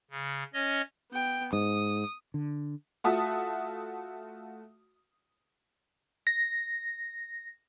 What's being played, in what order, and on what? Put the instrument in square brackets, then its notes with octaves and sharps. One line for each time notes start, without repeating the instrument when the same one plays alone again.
[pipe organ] C#3
C#4 C#5 D#5
[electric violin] B3 G5
[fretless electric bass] G#2 [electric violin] D#6
[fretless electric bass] D3
[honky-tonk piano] A3 F4 F#4 E5 A5 D#6
[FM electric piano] A#6